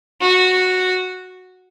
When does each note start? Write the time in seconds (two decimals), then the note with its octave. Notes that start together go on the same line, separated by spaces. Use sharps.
0.21 F#4